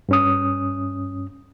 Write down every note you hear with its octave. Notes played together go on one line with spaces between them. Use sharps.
G2 C#4 D#6